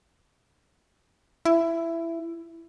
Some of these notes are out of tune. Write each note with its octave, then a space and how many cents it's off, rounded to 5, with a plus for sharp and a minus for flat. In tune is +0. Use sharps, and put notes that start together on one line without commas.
E4 +15